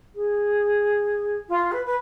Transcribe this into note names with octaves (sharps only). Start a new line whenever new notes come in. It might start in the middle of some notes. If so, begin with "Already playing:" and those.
G#4
F4
B4
B4